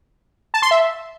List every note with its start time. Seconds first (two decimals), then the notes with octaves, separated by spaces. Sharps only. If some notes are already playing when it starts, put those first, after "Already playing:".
0.54 A5
0.62 C6
0.71 E5